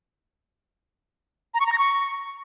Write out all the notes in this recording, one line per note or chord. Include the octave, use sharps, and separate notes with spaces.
A#5
C#6
A#5
A#6
C#6